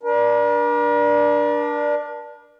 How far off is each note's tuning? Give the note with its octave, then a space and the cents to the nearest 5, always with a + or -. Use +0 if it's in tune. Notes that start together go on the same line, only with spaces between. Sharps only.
D4 +5 A#4 +45